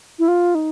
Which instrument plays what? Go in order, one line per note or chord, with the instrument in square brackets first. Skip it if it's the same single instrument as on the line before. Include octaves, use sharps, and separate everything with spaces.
[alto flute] E4
F4
D#4